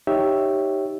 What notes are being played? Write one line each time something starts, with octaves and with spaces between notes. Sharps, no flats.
D#4 G4 C#5 E5